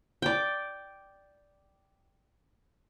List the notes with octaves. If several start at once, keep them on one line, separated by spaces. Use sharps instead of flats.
D5 G5